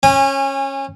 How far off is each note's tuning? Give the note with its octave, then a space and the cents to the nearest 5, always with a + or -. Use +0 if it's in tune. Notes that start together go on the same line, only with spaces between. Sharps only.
C#4 -20 G#5 -30